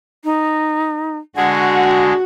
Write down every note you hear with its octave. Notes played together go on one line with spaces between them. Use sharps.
D#4
D3 G#3 F#4 G#4 F#5